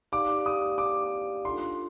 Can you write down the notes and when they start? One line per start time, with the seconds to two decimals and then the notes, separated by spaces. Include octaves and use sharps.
0.12 D#4 G4 D5 F5 D6
0.46 D#6
0.78 D6
1.45 D4 F4 A4 C6